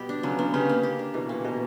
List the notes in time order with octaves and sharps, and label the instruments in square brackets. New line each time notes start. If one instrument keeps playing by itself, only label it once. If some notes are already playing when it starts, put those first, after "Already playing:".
Already playing: [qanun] B2 G3 B3 G4
D4
[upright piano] C#3 [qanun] F#3
[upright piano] D3 [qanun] B3
[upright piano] C#3 [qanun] G4
[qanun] A#3
G4
D4
[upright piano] B2 [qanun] E3
[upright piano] A#2 [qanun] A#3
[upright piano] B2 [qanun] G4